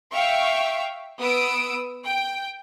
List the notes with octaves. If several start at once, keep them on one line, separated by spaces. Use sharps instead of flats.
E5 F5 G5 C#6
B3 D#6 E6 D7
G5